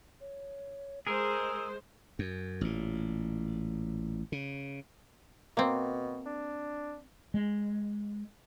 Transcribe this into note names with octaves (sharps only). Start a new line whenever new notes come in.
C#5
G#3 G#4 A#4 C5 E6
F#2
A1 A#2
C#3
B2 A#3 C4
D4
G#3